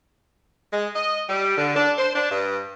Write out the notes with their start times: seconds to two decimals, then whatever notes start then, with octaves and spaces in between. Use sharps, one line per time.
0.72 G#3
0.95 D#5
1.28 G3
1.57 D3
1.76 D4
1.98 C5
2.15 D4
2.30 G2